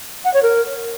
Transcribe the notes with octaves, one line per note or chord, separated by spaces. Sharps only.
F#5
C#5
A#4